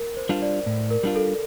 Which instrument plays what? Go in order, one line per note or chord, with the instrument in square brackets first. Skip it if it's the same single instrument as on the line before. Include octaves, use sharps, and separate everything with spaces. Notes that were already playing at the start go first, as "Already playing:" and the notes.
Already playing: [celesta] A#4
C5
[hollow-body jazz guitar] G3 D4 F4
[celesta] D5
[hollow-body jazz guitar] A2
[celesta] A#4
[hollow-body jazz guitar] G3 D4 F4
[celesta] A4